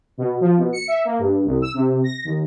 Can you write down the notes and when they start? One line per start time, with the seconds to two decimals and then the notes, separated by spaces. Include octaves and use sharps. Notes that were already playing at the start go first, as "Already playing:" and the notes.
0.18 B2
0.41 F3
0.58 B2
0.73 C#7
0.88 E5
1.05 A#3
1.19 G2
1.45 C2
1.62 E6
1.74 C3
2.04 A#6
2.24 D#2